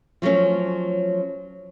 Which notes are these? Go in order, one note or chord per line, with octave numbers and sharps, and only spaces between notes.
F3 F#3 A3 C#4